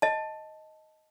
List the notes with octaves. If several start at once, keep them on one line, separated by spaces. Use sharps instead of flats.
D#5 A5